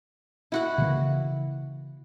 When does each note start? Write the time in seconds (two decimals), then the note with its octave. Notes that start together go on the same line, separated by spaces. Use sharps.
0.52 E4 F#4 F#5
0.78 C#3 E3 A#3